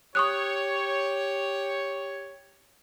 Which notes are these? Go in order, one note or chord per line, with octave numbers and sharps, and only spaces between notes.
G4 C#5 C#6 D#6 F#6